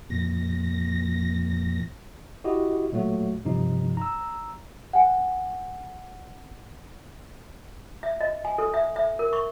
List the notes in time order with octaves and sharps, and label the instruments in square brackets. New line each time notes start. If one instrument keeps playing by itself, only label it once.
[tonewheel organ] F2 A#2 A#6
[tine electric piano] E4 F#4 G4 D#5
A#2 F#3 A3 F#4
G2 C3 F3 D#4
A#5 E6
[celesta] F#5 G#5
[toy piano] E5
D#5
G#5
A4
E5
E5
A#4
C#6